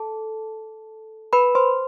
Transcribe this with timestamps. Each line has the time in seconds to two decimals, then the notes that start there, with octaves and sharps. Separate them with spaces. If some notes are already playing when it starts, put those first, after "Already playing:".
Already playing: A4 A5
1.33 B4 B5
1.55 C5 C6